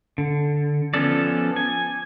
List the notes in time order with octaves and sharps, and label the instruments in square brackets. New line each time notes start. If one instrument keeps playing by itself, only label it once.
[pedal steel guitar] D3
F3 B3 C#4 A4 D5
G#5